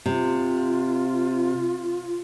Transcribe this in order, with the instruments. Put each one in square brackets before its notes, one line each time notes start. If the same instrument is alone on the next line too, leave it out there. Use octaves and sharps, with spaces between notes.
[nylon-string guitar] C3 [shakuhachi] F4